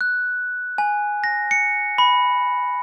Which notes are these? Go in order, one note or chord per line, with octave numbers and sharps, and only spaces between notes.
F#6
G#5
A#6
C#7
B5